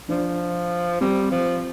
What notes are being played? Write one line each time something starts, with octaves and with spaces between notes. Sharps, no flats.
F3 D4
G3 C4
F3